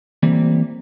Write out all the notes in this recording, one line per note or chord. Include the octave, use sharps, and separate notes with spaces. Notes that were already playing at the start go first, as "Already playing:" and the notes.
E3 G3 A3 A#3 C4